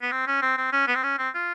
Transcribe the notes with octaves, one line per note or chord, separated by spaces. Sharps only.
B3
C4
C#4
C4
C4
C#4
B3
C4
C#4
C4
F4